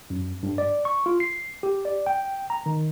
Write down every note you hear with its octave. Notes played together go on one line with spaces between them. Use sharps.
F#2
G2
D5
C#6
F4
C7
G4
D5
G5
A#5
D#3